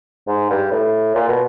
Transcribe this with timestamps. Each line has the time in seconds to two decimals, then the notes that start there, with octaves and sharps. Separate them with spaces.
0.27 G#2
0.50 G2
0.72 A2
1.15 A#2
1.28 B2